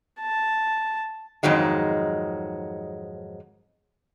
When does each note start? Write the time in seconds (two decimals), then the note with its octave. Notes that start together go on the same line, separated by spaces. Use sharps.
0.21 A5
1.43 F2 G#2 D#3 F#3 G#3